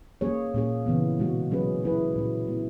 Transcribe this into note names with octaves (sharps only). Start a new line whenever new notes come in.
A#3 C#4 G#4 C#5
A#2 A#3 C#4 G#4
C#3 E3 B3
B2 G#3 B3 F#4
F#3 C#4 G#4 B4
G#3 C#4 E4 G#4 B4
A#2 G#3 C#4 F#4
G#3 B3 E4